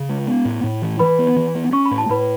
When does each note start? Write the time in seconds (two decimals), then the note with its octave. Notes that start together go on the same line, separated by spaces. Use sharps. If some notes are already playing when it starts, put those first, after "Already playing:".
Already playing: C#3
0.09 G#3
0.27 B3
0.45 A2
0.64 A2
0.82 E3
0.99 E3 B4 B5
1.19 B3
1.36 E3
1.55 B3
1.73 C#4 C#6
1.86 B5
1.91 A2
1.98 A5
2.09 A2 B4 B5